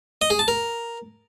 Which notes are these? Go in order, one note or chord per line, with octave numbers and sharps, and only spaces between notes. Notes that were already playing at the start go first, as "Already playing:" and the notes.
D#5
G#4
A5
A#4